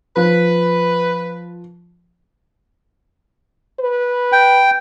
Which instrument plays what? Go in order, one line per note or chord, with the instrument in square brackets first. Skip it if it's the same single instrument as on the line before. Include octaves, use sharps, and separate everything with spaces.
[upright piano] F3 [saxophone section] B4
[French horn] B4
[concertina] G5